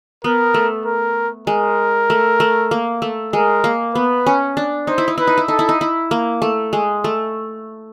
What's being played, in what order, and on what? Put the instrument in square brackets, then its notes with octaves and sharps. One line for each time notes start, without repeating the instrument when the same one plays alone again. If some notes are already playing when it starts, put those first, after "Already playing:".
[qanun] B3 [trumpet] A#4
[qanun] A3
[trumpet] A#4
[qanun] G#3 [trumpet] A#4
[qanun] A3
A3
A#3
A3
[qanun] G#3 [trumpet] A#4
[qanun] A#3
[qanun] B3 [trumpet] B4
[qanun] C#4
D4
[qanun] D#4 [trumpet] C5
[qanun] E4
D#4
[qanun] E4 [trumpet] B4
[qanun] D#4
E4
[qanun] D#4 [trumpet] A4
[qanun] E4
D#4
E4
A#3
A3
G#3
A3